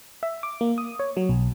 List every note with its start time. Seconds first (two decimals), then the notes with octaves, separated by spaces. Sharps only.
0.23 E5
0.43 D6
0.61 A#3
0.78 D#6
1.00 C#5
1.17 F#3
1.29 B1